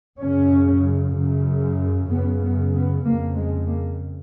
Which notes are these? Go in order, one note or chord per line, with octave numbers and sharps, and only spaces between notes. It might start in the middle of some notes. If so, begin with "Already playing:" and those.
F#2 C#3 C#4
F#2 C#3
F#2 C#3 B3
B3
B3
F2 C#3 A#3
G#3
A#3